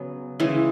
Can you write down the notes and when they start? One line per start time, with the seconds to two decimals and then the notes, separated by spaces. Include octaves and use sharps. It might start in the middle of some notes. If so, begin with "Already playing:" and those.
Already playing: C#3 F#3 B3
0.40 C#3 E3 G#3 E4